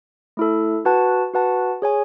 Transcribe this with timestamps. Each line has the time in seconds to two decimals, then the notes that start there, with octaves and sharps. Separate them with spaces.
0.37 A3 E4 A4
0.85 F#4 B4 F#5 A5
1.34 F#4 B4 F#5 A5
1.82 G#4 C#5 G#5